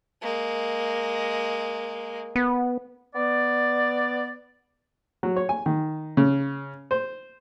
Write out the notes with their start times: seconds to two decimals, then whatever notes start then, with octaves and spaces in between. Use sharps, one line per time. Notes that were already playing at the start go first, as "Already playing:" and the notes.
0.22 G#3 A#3
2.36 B3
3.15 B3 D5
5.23 F#3
5.36 C#5
5.49 G#5
5.66 D#3
6.17 C#3
6.91 C5